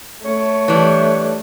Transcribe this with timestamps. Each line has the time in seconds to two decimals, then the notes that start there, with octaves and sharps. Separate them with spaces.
0.25 A3 C#5
0.68 E3 G3 D4